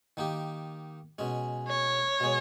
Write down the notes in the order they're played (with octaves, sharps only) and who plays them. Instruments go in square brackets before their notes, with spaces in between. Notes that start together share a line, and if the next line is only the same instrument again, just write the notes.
[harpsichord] D#3 A#3 D#4 G4
B2 G#3 C#4
[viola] C#5
[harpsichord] B2 G#3